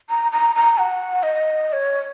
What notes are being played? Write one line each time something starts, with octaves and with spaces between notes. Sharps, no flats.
A#5
A#5
A#5
F#5
D#5
D#5
C#5